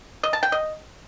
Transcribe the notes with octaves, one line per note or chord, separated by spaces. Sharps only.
D#5
A5
G5
D#5